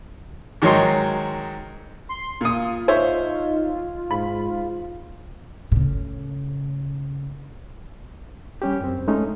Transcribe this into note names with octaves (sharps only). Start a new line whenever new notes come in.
G#2 D#3 F#3 C#5 D#5 C6
C6
A#2 F4 D#6
D#4 C5 C#5 E5
G#2 B5
A2 C#3
G3 C#4 G4
F#2 C4
G#3 A3 C#4 D#4